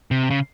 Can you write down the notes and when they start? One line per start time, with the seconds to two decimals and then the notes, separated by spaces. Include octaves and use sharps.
0.11 C3
0.30 C#3